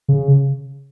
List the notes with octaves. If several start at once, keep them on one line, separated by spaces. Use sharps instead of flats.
C#3